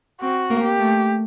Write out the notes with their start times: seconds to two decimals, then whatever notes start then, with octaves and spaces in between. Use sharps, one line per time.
0.22 C4 F#4
0.50 A#3
0.64 G4
0.79 A3